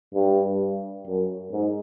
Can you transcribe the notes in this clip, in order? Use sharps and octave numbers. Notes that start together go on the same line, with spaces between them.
G2
F#2
G#2